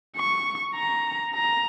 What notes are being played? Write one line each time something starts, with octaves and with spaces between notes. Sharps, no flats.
C#6
A#5
A#5